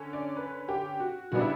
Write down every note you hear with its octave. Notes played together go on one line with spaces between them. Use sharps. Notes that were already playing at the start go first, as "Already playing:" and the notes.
Already playing: D3 C#4
D5
B4
G4
F#4
C#3 G3 B3 D4 F#4
E4